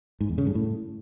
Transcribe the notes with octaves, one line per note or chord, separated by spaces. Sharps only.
G#2
E2
C#3
G2
A2